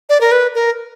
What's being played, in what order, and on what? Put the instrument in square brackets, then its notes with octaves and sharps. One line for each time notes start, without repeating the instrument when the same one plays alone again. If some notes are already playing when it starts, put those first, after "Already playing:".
[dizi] D5
A#4
B4
A#4